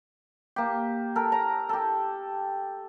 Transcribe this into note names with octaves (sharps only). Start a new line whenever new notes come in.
A#3 G4
A4 A#4
A#5
G4 A4